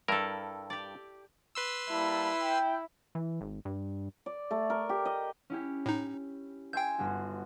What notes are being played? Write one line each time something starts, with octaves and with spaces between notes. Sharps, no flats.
G2 E4 A4 A#4
G4 D5
B4 C6 E6
G3 A#3 E4 A5
G5
E3
G#1
G2
D5
A3
A#4
G4
D#5
C#4 E4 G4
A2 D#4
E5 G5 G#5 C6 G6
G1 F#4